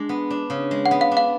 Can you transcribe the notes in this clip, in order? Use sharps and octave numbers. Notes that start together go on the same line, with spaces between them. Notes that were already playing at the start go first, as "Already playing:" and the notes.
Already playing: G#3 D4
B3
D4
C#3
G#3
F#5
B3
F5
D4
F5